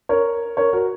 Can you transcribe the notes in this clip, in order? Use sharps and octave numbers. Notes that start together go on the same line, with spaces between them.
A#4 C#5
A#4 C#5
F#4 A#4